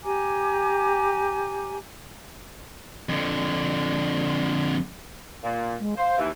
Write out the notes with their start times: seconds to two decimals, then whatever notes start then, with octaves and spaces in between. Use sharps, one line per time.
0.03 G4 G#5 A#5 D6
3.09 F2 D3
5.44 A#2
5.80 G#3
5.97 C5 F5
6.18 D#2 E3